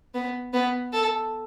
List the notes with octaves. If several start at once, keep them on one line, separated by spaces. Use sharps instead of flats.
B3
B3
A4